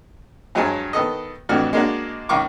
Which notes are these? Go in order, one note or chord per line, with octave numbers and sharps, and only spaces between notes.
G2 F#3 G#3 C#5 G#5 A5
D#3 B3 A4 D#5
F2 A2 E3 D4 F#4 F6
G#3 A#3 D4 F#4
C#2 D#3 F5 C#6 D6